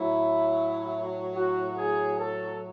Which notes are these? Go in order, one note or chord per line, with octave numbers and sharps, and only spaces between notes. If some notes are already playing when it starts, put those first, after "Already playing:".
Already playing: A2 F#3 E4
F#4
G#4
A4